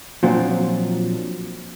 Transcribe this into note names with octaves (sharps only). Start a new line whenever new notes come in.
A#2 F3 F#3 C4 D4